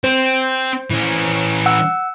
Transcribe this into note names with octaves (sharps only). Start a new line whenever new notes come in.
C4 C5
E3 C#4
F#5 E6